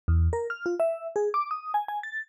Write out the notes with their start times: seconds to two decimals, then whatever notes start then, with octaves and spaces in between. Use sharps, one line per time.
0.08 E2
0.33 A#4
0.50 F6
0.66 F4
0.80 E5
1.16 G#4
1.34 D6
1.51 D#6
1.74 G#5
1.88 G#5
2.03 A6